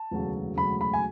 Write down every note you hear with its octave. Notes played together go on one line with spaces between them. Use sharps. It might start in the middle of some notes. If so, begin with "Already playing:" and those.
Already playing: A5
E1 D2 C#3 F#3
E1 D2 C#3 F#3 B5
B5
G#5